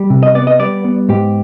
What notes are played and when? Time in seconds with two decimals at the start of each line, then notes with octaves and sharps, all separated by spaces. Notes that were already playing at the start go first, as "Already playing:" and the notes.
Already playing: G3
0.10 C3
0.23 D#5
0.35 B3 D5
0.47 D#5
0.59 G3 D5
0.84 B3
1.09 G#2 G4